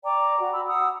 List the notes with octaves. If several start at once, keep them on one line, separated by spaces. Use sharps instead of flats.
D5 G5 A#5 D6
F#4
B5 E6
F#5 D#6 E6